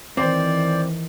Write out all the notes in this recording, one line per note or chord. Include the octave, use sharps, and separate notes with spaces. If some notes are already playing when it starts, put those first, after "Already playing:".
D#3 E3 C4 C5 D5